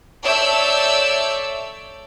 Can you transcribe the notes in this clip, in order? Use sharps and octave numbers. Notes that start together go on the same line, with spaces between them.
A4 C#5 D5 E5 E6 G6